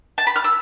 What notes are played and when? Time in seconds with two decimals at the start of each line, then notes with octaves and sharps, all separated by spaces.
0.18 A5
0.27 B5
0.36 F6
0.44 E6